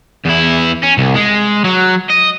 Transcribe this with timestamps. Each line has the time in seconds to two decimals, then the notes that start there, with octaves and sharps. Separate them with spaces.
0.25 E2 E4
0.83 C#4
0.98 C2
1.16 G#3
1.65 F#3
2.10 D#5